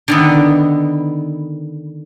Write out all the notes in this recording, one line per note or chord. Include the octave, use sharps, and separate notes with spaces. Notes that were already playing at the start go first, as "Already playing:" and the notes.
D3 D#3 B3